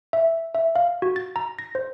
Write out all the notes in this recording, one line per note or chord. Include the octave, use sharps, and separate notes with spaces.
E5
E5
F5
F#4
A6
A#5
A#6
C5